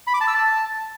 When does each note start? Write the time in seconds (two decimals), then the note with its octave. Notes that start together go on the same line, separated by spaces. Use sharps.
0.07 B5
0.14 D6
0.21 A5
0.28 E6
0.34 A5